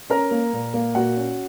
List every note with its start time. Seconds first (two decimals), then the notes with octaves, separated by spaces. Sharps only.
0.10 C#4 A#4 A#5
0.31 A#3
0.53 A#2
0.74 A#3
0.95 A#2 F#4 F#5
1.17 C#4